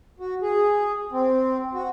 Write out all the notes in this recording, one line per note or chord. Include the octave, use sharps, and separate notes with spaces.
F#4
G#4
C4
F#4